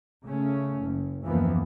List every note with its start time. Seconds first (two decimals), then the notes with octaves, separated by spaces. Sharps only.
0.24 C#3 A3 C#4
0.81 F#1
1.26 F#1 D#2 E3 F3 A#3 B3